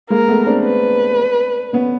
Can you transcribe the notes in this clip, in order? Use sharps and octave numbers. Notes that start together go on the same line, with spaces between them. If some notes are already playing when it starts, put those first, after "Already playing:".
G#3 A#3 A#4
A3 B3
C4 D4
B4
B3 C#4